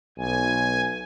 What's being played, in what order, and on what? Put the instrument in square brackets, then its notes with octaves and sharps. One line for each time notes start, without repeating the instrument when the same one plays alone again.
[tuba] B1 [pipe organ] G#5